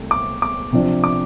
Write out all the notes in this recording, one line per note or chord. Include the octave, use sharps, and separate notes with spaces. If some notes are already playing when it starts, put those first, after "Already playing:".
Already playing: C2 A3
D6
D6
C3 F3 D4
D6